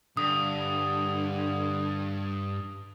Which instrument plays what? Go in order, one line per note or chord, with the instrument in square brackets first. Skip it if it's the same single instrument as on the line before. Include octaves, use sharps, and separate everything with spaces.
[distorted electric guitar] G2 [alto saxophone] D3 [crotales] D#6